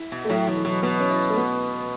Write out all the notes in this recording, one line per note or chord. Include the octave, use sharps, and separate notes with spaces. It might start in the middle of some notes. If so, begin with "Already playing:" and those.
Already playing: E4
B2
A3
A2 F#3
B2 E3
E3
B2 F#3
B2 B3
C#4
E4
A3
B3